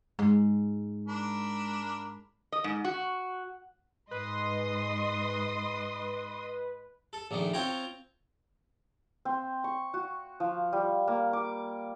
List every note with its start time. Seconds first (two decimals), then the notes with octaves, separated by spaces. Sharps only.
0.19 G#2 G#3
1.07 D4 A#4 B5
2.52 D#5
2.64 G#2
2.84 F#4
4.11 G#2 B4 D#5 C6 D#6
7.13 A4
7.31 A#1 A#2 D#3 A3
7.53 C4 F4 C#5 G5 A#5
9.25 C4
9.64 C#6
9.94 F#4
10.40 F3
10.73 G3
11.07 A#3
11.33 D6